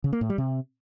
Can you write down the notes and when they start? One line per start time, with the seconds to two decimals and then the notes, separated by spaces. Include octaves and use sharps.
0.04 C#3
0.13 A#3
0.21 A2
0.30 G3
0.38 C3